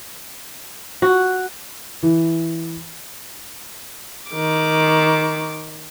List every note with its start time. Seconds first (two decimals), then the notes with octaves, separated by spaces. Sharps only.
1.02 F#4
2.03 E3
4.30 D#3 D6